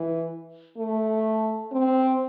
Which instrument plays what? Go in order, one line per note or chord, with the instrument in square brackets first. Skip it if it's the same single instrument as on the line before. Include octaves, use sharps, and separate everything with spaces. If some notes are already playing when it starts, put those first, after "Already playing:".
Already playing: [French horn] E3
A3
C4